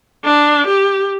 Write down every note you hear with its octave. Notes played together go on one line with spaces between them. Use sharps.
D4
G4